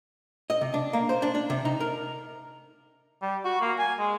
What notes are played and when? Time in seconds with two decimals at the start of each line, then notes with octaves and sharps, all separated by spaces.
0.50 D#5
0.61 C3
0.74 D4
0.93 A#3
1.09 C5
1.22 D4
1.35 D4
1.50 C3
1.65 D#4
1.80 A#4
3.22 G3
3.45 F#4
3.61 A#3
3.78 G#5
3.99 G#3